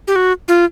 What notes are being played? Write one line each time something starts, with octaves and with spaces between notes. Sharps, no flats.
G4
F#4
F4